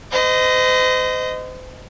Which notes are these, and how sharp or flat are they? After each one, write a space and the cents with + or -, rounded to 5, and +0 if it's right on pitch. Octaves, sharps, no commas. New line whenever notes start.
C5 -40 D#5 +0